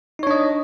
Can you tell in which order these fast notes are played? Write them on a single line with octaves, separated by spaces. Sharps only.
D#4 C#5 D4 D#5